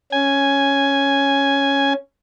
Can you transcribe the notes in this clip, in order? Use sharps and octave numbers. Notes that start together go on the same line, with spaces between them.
C#4 G#5